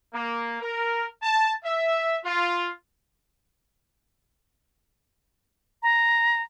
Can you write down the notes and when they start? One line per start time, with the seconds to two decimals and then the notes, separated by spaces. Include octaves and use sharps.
0.14 A#3
0.61 A#4
1.22 A5
1.64 E5
2.24 F4
5.83 A#5